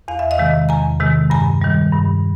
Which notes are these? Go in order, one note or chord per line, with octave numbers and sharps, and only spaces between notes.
E2 F5
E5
D#5 F5
C3 D#3 G#3
E2 G#5 A#5
C3 D#3 G#3
G2 G#5 A#5
D#3 G3
G2